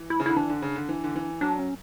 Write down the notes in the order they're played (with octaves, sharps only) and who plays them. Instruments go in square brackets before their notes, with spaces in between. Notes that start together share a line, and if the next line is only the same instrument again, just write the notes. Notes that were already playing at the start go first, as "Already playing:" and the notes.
Already playing: [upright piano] E3
[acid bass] E4
[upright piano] C#3
[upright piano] D3 [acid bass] E4
[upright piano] E3 [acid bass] D4
[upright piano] D3
C#3
D3
E3
D3
E3
[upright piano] F#3 [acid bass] D4
[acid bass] C#4